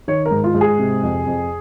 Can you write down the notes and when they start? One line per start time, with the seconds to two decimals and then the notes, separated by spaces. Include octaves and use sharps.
0.08 D#3 C#5
0.26 A#4
0.31 G#2
0.44 F4
0.54 G#2
0.61 G#4
0.78 C3
1.03 F2
1.26 F2